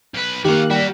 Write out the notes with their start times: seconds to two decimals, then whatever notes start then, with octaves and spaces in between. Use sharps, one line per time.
0.14 B1 B4
0.45 D#3 A#3 F#4 G4 F5 F#6
0.70 G3 F#4 A#4 B6